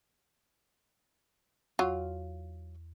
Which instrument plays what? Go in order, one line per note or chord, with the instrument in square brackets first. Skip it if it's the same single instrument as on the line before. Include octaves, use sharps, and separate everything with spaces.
[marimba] E2 [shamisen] F#3 F4